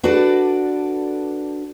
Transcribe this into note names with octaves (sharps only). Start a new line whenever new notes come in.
D4 F#4 A4 B4 D5